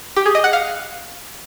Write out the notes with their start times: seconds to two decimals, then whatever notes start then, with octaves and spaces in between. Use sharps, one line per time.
0.16 G4
0.26 G#4
0.35 D#5
0.44 F#5
0.53 F5